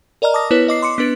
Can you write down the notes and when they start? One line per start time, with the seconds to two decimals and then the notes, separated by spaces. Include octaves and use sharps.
0.22 A#4 D5 D#5 A#5 F6
0.34 A5 D6 D#6 A#6
0.51 B3 E4 B4 C#5
0.68 D#5 D6 C7
0.82 C6 D6 C#7
0.98 B3 D4 B4 A6 D7